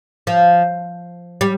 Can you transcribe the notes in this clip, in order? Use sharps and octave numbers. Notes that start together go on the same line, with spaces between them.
F3
G3